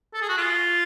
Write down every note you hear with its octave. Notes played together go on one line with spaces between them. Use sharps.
A4
G#4
F#4
F4